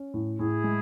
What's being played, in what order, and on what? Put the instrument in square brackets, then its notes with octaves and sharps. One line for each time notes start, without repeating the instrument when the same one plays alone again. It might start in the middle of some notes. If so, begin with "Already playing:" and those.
Already playing: [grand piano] C#4
A2
[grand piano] A2 [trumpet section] E4 G#4
[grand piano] G#3